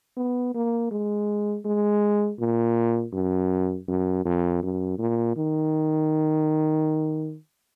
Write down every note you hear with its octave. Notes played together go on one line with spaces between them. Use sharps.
B3
A#3
G#3
G#3
A#2
F#2
F#2
F2
F#2
A#2
D#3